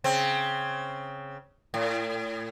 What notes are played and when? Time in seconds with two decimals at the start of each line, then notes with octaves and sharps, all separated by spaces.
0.04 C#3 C4
1.74 A2